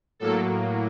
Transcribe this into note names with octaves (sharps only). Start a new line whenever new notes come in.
A2 F#3 A#3 A4